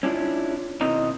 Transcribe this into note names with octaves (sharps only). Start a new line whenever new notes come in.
C#4 D4 E4 F4
B2 D#3 C4 E4 D#5 A#5